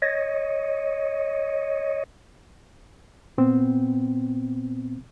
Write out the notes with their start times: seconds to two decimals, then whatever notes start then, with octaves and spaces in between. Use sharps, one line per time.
0.02 C#5 D#5
3.38 A#2 B3 C4